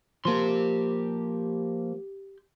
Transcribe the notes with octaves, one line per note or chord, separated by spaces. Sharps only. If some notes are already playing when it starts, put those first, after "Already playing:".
F3 A#3 G4 C6